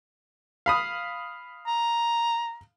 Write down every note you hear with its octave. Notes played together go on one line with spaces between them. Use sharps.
F5 B5 D#6
A#5